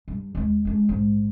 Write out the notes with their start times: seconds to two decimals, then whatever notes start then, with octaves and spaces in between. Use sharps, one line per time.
0.08 G2
0.35 D#2 G#3
0.65 G#3 D4
0.89 A#1 G#2